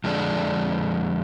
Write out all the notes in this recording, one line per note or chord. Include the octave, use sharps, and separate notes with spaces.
F2 D3 G#3 D4